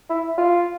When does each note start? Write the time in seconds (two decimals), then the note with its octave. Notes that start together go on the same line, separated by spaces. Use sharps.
0.10 E4
0.38 F4